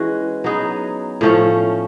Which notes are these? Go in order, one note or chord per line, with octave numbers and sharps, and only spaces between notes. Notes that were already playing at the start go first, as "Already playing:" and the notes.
Already playing: E3 G#3 C#4 F#4
F#3 B3 D#4 G#4
A2 F3 A3 C#4